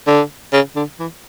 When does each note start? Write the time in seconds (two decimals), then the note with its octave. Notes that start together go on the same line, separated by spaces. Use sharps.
0.07 D3
0.53 C#3
0.76 D3
0.99 E3